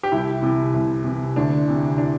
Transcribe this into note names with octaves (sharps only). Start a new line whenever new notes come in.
G4
C2 E4
C3 E3
C2
C3 E3
D2 D4
C3 E3
D4